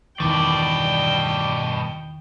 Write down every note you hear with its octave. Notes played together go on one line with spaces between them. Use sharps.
E2 G2 B2 D#3 E3 D5 G5